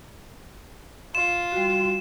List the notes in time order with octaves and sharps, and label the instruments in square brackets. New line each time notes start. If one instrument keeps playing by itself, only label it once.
[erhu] F4 [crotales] E7
[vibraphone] G3 F#4